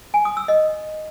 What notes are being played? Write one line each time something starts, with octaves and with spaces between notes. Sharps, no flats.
G#5
D#6
E6
D#5